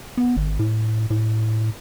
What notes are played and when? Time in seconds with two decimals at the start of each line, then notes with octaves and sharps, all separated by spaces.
0.18 B3
0.37 G#1
0.59 A2
1.10 A2